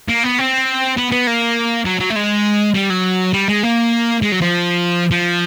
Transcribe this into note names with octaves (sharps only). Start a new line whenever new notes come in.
A#3
B3
C4
B3
B3
A#3
F#3
F#3
A3
G#3
G3
F#3
G3
G#3
A#3
G#3
F#3
F3
F3